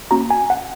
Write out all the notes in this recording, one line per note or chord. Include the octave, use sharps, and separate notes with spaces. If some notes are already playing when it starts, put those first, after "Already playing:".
A#3 C#4 F#4 A#5
G#5
F#5